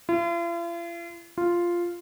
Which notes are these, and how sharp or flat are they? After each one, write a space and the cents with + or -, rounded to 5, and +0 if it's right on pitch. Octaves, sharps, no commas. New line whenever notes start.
F4 -45
F4 -5